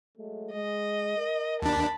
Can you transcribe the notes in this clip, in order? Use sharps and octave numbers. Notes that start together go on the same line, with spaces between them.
F#3 G#3 A3
G#3 D#5
A#4
D#2 D4 A5 B5